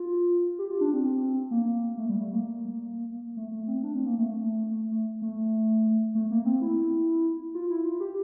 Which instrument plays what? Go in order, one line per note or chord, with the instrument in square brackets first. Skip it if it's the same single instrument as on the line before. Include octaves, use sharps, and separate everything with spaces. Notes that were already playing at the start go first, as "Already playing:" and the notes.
Already playing: [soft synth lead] F4
G4
F4
D4
C4
C4
A#3
A3
G3
A3
A#3
A3
A3
C4
D4
C4
A#3
A3
A3
A3
A#3
C4
E4
F4
E4
F4
G4